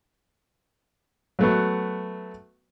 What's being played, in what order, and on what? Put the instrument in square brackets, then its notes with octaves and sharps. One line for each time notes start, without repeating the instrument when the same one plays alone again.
[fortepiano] F#3 A3 B3